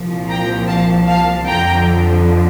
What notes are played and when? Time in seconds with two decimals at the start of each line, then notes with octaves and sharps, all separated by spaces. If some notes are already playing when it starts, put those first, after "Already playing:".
Already playing: C2 A#2 F3
0.29 G5 A#5
0.68 F5 A5
1.07 F5 A5
1.46 F2 D3 F3 G5 A#5